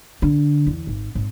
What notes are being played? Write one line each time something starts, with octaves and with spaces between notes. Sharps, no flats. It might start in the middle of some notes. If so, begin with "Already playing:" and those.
D3
E2
G#1
G#1